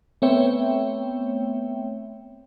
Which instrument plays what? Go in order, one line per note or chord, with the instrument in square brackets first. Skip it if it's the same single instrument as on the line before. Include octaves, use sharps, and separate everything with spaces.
[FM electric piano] A3 B3 C4 C#5 E5 G5